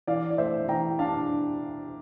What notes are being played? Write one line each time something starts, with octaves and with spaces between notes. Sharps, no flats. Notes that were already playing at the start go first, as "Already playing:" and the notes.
E3 D5 F5
D5
A3 C5 E5
E3 G5 A#5
D4 F5 A5